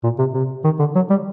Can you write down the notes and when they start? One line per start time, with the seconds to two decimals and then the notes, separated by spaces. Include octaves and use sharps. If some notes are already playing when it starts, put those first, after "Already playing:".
0.04 A#2
0.19 C3
0.34 C3
0.64 D#3
0.79 D3
0.95 F#3
1.10 G3